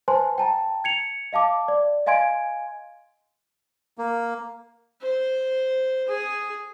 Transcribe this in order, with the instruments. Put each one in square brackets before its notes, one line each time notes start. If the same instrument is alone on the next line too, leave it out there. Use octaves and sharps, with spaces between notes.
[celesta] B4 C5 G#5 A5 C6
G5 A5 A#5
G#6 C#7 F7
D#5 F5 A5 D6
D5
D#5 F5 G#5 C6 G#6 D7
[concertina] A#3
[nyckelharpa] C5
G#4